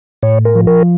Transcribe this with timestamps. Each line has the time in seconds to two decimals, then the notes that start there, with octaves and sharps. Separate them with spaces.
0.23 A2 C#5
0.45 A#4
0.55 F3
0.67 A#4